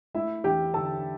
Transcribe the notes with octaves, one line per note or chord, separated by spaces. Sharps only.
A3 E4 E5
E2 G4 G5
D3 A4 A5